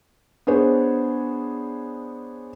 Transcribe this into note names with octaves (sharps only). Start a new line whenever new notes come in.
B3 D4 G#4 C5 C#5